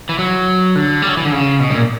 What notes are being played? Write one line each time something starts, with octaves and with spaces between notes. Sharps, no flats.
E3
F#3
D3
G3
F#3
E3
D3
C#3
B2
G2
A#2